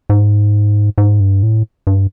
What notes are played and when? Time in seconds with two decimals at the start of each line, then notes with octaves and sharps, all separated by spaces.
0.10 G#2
0.98 G#2
1.20 G2
1.43 A2
1.87 G2